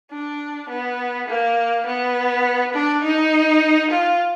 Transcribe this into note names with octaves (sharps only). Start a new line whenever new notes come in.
D4
B3
A#3
B3
D4
D#4
F4